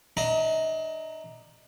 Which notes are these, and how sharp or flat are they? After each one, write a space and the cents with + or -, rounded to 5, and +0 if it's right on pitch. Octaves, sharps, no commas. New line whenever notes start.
D4 +35 D#5 +45 A#5 +0